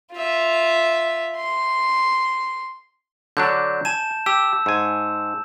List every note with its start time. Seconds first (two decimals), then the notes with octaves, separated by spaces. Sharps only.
0.13 F4 E5
1.37 C6
3.37 D3 F#3 D4 G6
3.85 G#5 A5 E7
4.26 G4 E6
4.66 G#2 G#5